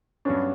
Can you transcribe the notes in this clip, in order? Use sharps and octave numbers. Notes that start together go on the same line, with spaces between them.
G2 F#3 B3 C#4 D4